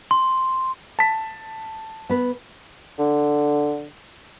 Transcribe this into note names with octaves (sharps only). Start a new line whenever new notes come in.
C6
A5 B6
B3 B4
D3